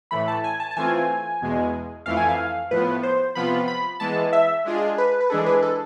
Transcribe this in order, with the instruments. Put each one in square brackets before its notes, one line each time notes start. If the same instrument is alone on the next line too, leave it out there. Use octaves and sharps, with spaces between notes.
[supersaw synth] A2 E3 A3 [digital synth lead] B5
[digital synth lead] A5
G#5
A5
A5
[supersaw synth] E3 A3 C4 F4 [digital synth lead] G#5
[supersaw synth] E2 B2 G#3
[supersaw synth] F2 E3 A3 E4 [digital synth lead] F5
[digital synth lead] G#5
F5
[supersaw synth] A2 F3 B3 [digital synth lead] B4
[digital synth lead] C5
[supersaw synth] C3 F3 B3 F4 [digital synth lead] B5
[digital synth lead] B5
[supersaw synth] E3 G#3 B3 [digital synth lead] A5
[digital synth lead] E5
[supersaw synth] G#3 D4 F4 G#4
[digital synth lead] B4
B4
[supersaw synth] E3 G#3 D4 G#4 [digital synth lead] A4
[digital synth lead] B4
A4